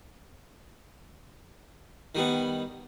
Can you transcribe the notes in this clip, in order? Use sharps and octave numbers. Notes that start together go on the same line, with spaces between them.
D#3 G3 B3